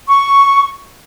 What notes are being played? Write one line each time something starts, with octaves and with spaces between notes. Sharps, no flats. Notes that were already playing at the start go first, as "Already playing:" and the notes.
C#6